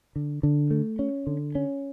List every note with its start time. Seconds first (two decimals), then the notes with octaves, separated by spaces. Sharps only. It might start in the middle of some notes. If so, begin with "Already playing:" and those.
0.16 D3
0.43 D3
0.71 A3
0.99 C#4
1.27 D3
1.55 C#4